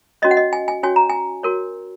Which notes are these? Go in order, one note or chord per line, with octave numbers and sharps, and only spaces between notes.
C#4 F#4 C#5 D#5
F#5
D#5
G#5
G#5
C#4 F#4 C#5 G#5
A#5
G#5
F#4 A#4 C#5